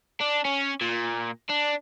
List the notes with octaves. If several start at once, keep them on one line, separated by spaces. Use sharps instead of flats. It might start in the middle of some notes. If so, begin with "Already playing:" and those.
D4
C#4
A#2
D4